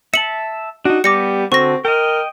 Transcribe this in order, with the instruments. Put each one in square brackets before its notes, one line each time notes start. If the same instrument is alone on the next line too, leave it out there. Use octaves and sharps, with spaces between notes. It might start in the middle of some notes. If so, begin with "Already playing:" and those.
[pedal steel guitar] E5 A5 [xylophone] C#7 F#7
[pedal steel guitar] D4 D#4 [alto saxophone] F#4
[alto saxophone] G3 [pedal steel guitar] B3 G4 [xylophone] D6 A#6 C#7
[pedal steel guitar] D3 F#4 A4 [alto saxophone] C4 [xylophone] C#6 A#6
[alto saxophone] A#4 [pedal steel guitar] D#5 G5